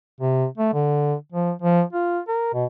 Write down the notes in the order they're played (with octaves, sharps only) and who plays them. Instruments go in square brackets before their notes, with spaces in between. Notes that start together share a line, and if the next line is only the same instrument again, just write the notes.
[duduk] C3
A3
D3
F3
F3
F4
A#4
B2